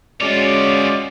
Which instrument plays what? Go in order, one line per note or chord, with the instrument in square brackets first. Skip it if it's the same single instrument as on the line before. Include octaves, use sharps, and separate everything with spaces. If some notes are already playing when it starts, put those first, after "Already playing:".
[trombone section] G#3 C#4 F#4 [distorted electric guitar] F4 C#5 [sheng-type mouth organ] D5